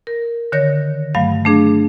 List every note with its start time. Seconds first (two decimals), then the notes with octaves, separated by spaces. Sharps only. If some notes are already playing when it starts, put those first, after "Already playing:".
0.07 A#4
0.52 D3 D#3 C#5 A#6
1.15 G2 F#3 A3 F5
1.45 A3 D4 G#4